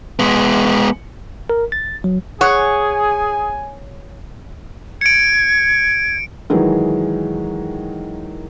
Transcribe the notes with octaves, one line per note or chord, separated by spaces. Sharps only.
G#3 B3
A#4
A6
F#3
G#4 C#5 F#5 G#5
G#6 C#7 D7
D#3 E3 F#3 G#3